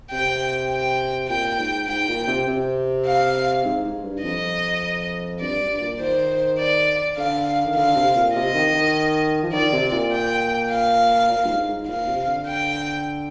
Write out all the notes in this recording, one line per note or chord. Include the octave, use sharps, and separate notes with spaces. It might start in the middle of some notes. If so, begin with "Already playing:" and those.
C3 G5
G5
A#2 G5
G#2
G#2 G5
A#2
C3
C3
F5
G#2
G#2
G2
F2 D#5
G2 D5
G2
A#2
D#3 C5
D5
D3 F5
D#3
D3 F5
C3
A#2
C3 D#5
D#3
D#3
F3
D#3 D5
C3
A#2
G5
F5
A#2
G2
G#2
G#2
A#2 F5
C3
D3
G5